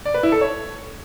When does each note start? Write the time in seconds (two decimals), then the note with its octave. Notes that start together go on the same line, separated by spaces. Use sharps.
0.05 D5
0.14 B4
0.23 E4
0.32 A4
0.41 C#5